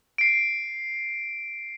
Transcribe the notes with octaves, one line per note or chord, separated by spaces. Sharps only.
C7 D7